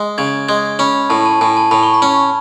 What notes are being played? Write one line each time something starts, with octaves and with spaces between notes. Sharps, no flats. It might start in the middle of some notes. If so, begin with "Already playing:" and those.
Already playing: G#3
C#3 G#6
G#3 G#6
C#4 B5
A2 A5
A5
A2 G#5
A5
A2 B5
C#6
B5
C#4